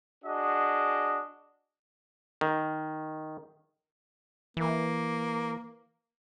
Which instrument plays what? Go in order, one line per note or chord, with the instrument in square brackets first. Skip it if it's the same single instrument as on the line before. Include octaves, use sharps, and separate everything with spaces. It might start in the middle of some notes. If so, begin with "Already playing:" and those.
[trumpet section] D4 F#4 G#4 D#5
[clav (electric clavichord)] D#3
[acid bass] E3 [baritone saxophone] A#3